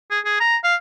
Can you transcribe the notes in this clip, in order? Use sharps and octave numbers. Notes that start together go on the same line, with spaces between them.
G#4
G#4
A#5
F5